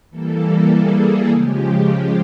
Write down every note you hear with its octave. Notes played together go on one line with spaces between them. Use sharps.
E3 G3 A#3 A4
G#4
C#3 F3 G#3 G4